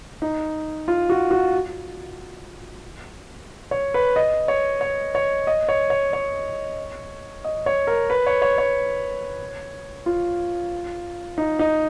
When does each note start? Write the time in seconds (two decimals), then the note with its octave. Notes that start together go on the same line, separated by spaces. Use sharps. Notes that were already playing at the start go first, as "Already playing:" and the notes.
0.22 D#4
0.88 F4
1.10 F#4
1.31 F#4
3.71 C#5
3.94 B4
4.16 D#5
4.48 C#5
4.81 C#5
5.15 C#5
5.47 D#5
5.69 C#5
5.90 C#5
6.13 C#5
7.44 D#5
7.66 C#5
7.87 A#4
8.10 B4
8.27 C#5
8.42 C#5
8.58 C#5
10.06 F4
11.38 D#4
11.59 D#4